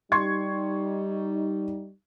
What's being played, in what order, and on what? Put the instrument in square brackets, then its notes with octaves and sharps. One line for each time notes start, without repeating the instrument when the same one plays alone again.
[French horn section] G3 D#4 [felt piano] C6 C#6 G#6